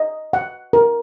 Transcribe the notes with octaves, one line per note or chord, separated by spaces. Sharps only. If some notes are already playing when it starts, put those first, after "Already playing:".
Already playing: D#5
F#5
A#4